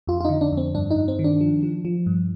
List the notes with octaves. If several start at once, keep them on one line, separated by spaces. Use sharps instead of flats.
F2 F4
F4
D#4
D3
D4
F2
C4
G2 D4
D#4
G2
C4
D#3
D4
F3
F3
F3
G2